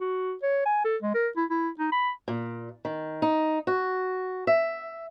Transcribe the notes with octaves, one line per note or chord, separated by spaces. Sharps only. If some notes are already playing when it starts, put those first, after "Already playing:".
F#4
C#5
G#5
A4
G#3
A#4
E4
E4
D#4
B5
A#2
D#3
D#4
F#4
E5